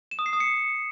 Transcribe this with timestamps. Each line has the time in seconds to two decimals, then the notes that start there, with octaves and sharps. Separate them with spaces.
0.11 E7
0.19 D#6
0.26 C7
0.33 D#6
0.40 C#7